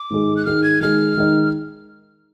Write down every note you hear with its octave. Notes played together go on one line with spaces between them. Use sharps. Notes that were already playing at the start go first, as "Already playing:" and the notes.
Already playing: D6
G#2 D#3 G#3
F#6
G#2 D#3 G#3 F6
G#6
D#3 G#3 D#4 F6
D#3 G#3 D#4